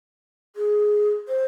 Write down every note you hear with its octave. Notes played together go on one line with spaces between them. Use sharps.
G#4
C5